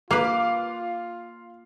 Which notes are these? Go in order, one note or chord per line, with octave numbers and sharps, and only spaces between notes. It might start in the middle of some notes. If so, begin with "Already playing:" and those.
A#3 F4 B4 F5 D6